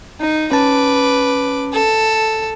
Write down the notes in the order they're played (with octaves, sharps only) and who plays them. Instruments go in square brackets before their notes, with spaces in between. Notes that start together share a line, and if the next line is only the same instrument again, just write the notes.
[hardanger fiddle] D#4
[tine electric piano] C#4 A5 [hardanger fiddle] B4 D6
[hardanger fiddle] A4